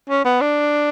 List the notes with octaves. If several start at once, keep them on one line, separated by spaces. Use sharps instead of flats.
C#4
B3
D4